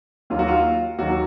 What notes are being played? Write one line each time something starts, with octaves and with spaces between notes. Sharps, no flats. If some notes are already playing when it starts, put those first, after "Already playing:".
D#2 D#3 F#3 F4
F#4
F4
D#2 D#3 F#3 F#4